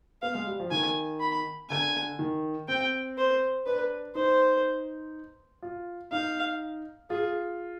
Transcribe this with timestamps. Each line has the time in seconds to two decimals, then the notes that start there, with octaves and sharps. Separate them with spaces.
0.22 B3 F5
0.35 G#3
0.47 G3
0.60 F3
0.71 D#3 G#5
1.20 B5
1.70 D3 G#5
2.19 D#3
2.68 C4 G5
3.18 C5
3.66 D4 B4
4.15 D#4 C5
5.62 F4
6.12 D#4 F5
7.10 F4 G#4